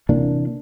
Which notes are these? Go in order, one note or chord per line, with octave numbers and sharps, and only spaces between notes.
C3 E3 A#3 D4